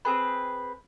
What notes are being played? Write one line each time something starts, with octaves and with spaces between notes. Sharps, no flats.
C4 G#4 B4